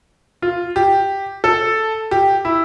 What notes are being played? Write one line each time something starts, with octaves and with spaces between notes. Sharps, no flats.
F4
G4
A4
G4
E4